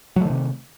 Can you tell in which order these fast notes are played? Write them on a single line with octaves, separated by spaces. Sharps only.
F#3 A3 D#3 C3